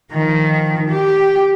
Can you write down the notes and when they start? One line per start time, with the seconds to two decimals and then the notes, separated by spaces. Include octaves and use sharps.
0.12 D#3 F3
0.89 G4